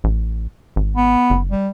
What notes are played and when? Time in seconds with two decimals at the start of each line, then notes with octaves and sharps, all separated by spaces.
0.04 A1
0.76 G#1
0.96 B3
1.30 F#1
1.51 G3